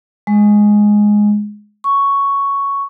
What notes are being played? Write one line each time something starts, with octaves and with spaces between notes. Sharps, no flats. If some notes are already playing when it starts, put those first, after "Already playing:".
G#3
C#6